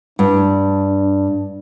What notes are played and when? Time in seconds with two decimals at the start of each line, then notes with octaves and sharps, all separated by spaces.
0.19 G2 D4